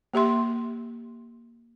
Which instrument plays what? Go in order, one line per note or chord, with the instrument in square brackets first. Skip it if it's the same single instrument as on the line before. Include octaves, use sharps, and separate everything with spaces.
[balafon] A#3 G4 E5 C6